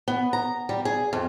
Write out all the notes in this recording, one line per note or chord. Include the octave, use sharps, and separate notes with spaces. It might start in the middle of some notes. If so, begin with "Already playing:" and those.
B3
A#5
G3
G#4
F2